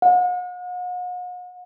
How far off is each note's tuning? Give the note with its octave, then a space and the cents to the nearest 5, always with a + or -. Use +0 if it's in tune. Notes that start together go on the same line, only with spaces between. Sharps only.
F#5 -45